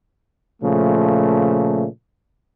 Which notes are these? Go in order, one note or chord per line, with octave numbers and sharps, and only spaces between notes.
A#2 C#3 F3 A3